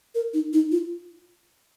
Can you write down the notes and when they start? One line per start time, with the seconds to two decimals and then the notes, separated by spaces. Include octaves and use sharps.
0.15 A#4
0.34 D#4
0.53 D#4
0.71 F4